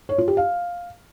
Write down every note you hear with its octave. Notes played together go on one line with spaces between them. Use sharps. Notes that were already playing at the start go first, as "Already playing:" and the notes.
C#5
F4
G4
F5